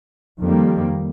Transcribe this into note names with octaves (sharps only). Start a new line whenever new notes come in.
F2 D#3 G3 A#3